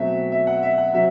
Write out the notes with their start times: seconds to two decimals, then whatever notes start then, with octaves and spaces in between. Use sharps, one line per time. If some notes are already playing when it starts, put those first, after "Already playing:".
Already playing: B2 F#3 A3 C4 E5
0.32 E5
0.47 F#5
0.63 E5
0.78 F#5
0.94 C3 F#3 C4 E5